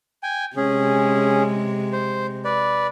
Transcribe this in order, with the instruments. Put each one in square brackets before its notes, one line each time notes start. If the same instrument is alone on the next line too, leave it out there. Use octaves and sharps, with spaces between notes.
[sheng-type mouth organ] G5 G#5
[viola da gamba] C3 G#3 [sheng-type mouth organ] C#4 G#4
[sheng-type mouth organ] C5
B4 D5